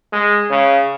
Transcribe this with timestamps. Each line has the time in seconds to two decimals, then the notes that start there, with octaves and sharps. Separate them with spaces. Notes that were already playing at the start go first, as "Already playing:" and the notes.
0.13 G#3
0.50 C#3